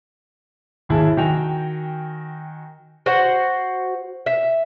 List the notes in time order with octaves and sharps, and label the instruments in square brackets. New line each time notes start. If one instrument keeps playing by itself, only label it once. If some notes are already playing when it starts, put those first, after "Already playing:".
[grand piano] G#1 D#2 E4 G#4 A5
D#3 F#4 G5 G#5 F7
[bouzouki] F#4 C5 F#5
E5